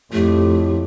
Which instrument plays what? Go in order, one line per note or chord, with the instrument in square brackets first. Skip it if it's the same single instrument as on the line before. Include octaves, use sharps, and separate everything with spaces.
[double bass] F2 [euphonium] A2 [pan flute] A3 [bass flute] G4